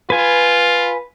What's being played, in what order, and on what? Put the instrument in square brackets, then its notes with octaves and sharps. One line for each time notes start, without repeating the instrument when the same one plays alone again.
[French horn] F4 [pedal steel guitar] B4 G#5